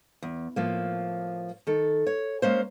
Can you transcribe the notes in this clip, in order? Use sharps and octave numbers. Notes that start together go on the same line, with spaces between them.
E2
A2 F3 A#3
D#3 A4
C#5
G#3 A#3 C#4 C5